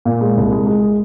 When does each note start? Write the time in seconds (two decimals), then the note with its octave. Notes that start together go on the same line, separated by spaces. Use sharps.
0.05 A#2
0.21 G#3
0.37 C2
0.52 G#3
0.67 G#3